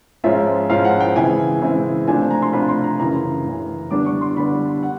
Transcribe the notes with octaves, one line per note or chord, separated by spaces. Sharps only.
G#2 F3 G#3 C#4 F4 E5
G#2 F3 G#3 C#4 F4 F5
F#5
G5
C#3 E3 G#3 C4 E4 G#5
C#3 E3 G#3 C4 E4
C3 F3 A3 D4 F4 G#5
A#5
C6
C3 F3 A3 D4 F4 B5
C6
A#5
F#2 C#3 E3 A#5
F#2 C#3 E3
D3 G3 B3 D4 D6
C#6
C6
D3 G3 B3 D4 B5
F#5